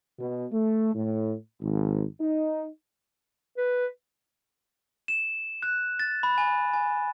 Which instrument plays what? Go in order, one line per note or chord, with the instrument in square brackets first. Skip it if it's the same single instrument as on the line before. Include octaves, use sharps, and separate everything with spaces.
[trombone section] B2
A3
A2
G#1
D#4
[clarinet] B4
[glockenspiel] E7
F#6
A6
B5
G#5
G#5